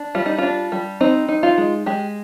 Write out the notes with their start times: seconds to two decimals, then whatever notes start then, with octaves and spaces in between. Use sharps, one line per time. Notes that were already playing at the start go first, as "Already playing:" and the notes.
Already playing: D4
0.15 G3 F4
0.26 D#4
0.38 D4 F4
0.72 G3
1.01 C4 D#4
1.29 D#4
1.43 F4
1.58 G#3
1.86 G#3 G4